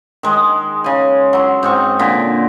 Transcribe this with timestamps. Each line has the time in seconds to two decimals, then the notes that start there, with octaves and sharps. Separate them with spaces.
0.23 D#3 G#3
0.84 C#3 G#5
1.33 F#3 C6
1.63 G#2 C4 C#6
1.99 A#2 D3